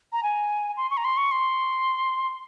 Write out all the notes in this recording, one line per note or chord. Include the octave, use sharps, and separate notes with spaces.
A#5
G#5
C6
C#6
A#5
C6
C#6
C6